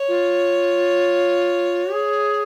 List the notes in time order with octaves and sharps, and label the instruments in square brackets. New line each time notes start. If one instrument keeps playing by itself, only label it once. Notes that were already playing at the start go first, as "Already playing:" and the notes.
Already playing: [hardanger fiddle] C#5
[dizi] F4
G#4